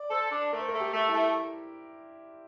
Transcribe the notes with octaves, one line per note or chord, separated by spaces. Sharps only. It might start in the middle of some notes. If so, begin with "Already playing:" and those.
Already playing: D5
A4 C5
D4
A3 A#4
C5
A#4
A3
G4
A3
E4
A3